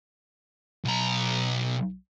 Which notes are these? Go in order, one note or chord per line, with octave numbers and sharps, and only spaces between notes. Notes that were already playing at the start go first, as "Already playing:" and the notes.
B1 A#5